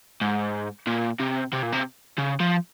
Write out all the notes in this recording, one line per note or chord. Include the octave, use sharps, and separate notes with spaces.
G#2
A#2
C3
C3
A#2
C3
C#3
F3